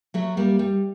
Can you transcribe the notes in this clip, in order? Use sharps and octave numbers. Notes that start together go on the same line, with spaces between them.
F#3 A3
G3 A#3
G3